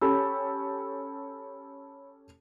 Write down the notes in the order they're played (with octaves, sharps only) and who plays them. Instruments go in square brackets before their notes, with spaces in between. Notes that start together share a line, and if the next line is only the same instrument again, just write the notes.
[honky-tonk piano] C#4 G4 A4 [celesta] C#5 B5 E6